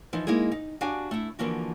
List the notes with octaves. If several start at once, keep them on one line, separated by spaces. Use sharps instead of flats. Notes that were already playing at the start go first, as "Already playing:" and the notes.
E3 F3 D#4
G#3 A#3 D#4 E4 G#4
D#4
D4 F#4 G4 F5 G#5
A3 E4
D3 E3 F3 A#3 F#4